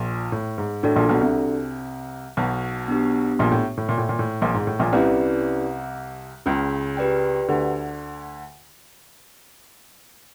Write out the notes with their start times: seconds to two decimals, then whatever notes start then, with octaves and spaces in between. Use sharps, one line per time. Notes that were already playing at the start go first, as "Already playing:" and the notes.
Already playing: A#1 A#2
0.32 A2
0.58 G#2
0.83 A2 D4 F#4 A4 D5
0.96 A#1 A#2
1.09 B1 B2
1.21 C2 C3
2.37 B1 B2
2.88 B3 D4 G4
3.39 A#1 A#2
3.52 A2
3.77 A2
3.89 A#2
3.98 A2
4.09 A#2
4.19 A2
4.42 A#1 A#2
4.54 G#2
4.67 A2
4.79 A#1 A#2
4.93 C2 C3 C#4 E4 G4 B4 D5
6.46 C#2 C#3
6.97 G4 B4 D5 G5
7.48 D2 D3